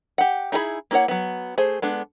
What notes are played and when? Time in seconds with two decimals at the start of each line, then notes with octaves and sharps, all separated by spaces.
0.18 G4 F#5
0.52 D#4 E4 G#4 C5 B5
0.91 A#3 E4 C5 C#5 F#5
1.08 F#3 B3
1.58 A3 G#4 C5
1.82 G#3 B3 D4 A4